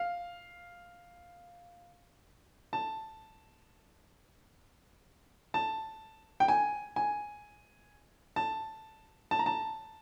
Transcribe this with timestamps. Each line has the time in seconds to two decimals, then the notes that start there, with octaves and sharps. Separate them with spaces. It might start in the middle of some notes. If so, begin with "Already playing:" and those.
Already playing: F5
2.73 A5
5.54 A5
6.40 G5
6.48 G#5
6.96 G#5
8.36 A5
9.31 A5
9.39 A#5
9.46 A5